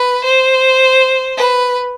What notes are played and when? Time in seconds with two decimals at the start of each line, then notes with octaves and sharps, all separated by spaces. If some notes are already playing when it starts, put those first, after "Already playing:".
Already playing: B4
0.24 C5
1.37 B4